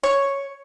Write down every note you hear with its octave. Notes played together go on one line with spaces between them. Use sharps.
C#5